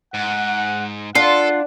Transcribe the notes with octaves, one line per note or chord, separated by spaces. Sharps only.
G#2 F#5
D4 F4 A4 F#5